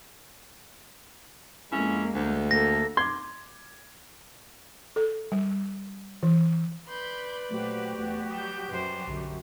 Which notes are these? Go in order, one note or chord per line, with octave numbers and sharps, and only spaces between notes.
F2 G#3 A#3 C#4 E4
D2
A#3 A4 A#6
C6 D6 G#6
A4
G3
E3
B4 D5 B5 C6 G6
A#2 F#3 A3 F#4 G4 C5
E2 A3 B3
F#3 G3 D#6 G6 B6 E7
F#2 F#3 G3 B4 C5
B1 F#2 D3